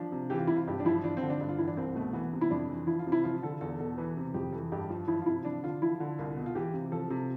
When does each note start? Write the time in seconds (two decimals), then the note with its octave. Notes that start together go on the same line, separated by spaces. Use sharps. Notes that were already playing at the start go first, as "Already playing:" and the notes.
Already playing: F3 D4
0.12 C3
0.30 E3 G4
0.39 F4
0.47 C3 E4
0.56 F4
0.67 G2 G4
0.80 D4
0.85 F3 E4
1.04 F3 D4
1.17 C4
1.23 D3
1.30 D4
1.41 G2
1.49 F4
1.58 E3 E4
1.68 D4
1.77 C2 C4
1.95 B2 A3
2.13 E3 B3
2.33 C3
2.41 E4
2.51 F2 D4
2.69 E3
2.87 F3 E4
2.99 F4
3.07 C3
3.12 E4
3.24 F3 F4
3.42 D3 A4
3.61 E2 A4
3.79 B2 A4
3.97 E3 B4
4.17 C3
4.34 F2 G4
4.52 E3 A4
4.72 G2 G4
4.89 F3 F4
5.08 F3 E4
5.22 F4
5.26 C3 E4
5.45 F3 D4
5.63 D3 F4
5.82 F3 E4
6.00 D3
6.18 C2 F4
6.36 B2
6.46 F4
6.55 E3 G4
6.74 C3
6.92 F3 A4
7.10 C3